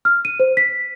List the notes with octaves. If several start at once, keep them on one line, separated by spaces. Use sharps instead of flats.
F6
D#7
C5
B6